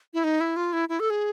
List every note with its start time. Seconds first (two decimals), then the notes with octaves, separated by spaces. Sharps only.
0.14 E4
0.24 D#4
0.40 E4
0.56 F4
0.73 E4
0.89 E4
1.00 A4
1.10 G#4